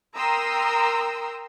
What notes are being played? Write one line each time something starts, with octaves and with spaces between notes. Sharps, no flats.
A#4 G5 A#5 C6 D#6 E6